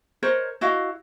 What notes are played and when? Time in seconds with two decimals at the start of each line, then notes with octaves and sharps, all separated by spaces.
0.23 A#4 C5 C#5 D#5
0.61 E4 F#4 D#5 F5